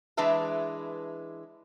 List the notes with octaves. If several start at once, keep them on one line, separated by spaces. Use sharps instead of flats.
E3 G#3 D4 B4 E5 A5